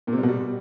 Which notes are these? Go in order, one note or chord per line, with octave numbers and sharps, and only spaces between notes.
A#2
C3
G3
B2
G3